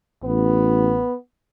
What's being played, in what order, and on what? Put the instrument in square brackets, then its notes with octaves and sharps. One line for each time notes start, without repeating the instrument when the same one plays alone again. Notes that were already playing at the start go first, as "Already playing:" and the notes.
[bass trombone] A1 [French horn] B3